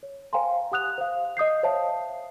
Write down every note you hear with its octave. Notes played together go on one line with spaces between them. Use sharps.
C#5
C5 F5 G5 G#5 A#5 C6
G4 F#5 D#6 F#6 F7
C5 F5
D#5 D#6 G6 C7
C5 C#5 E5 F5 A5